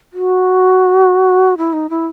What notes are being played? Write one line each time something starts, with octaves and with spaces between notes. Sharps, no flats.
F#4
E4
D#4
E4